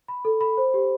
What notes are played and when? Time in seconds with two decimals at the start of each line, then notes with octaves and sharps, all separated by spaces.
0.08 B5
0.25 A4
0.41 B5
0.57 C5
0.74 G4